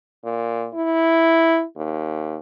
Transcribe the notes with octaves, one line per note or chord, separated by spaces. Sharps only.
A#2
E4
D#2